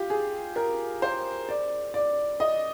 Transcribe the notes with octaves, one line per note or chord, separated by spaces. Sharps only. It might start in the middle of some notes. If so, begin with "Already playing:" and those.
Already playing: F4 G4
G#4
A#4
C5
D5
D5
D#5